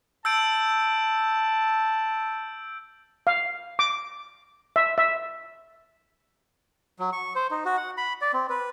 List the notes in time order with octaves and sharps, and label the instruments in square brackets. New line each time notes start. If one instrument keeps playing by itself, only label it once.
[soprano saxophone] A5 [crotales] E6 G6 D7
[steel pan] F5
D6
E5
E5
[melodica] F#3
C#6
C5
D#4
F#4
F#5
B5
D5
C4
B4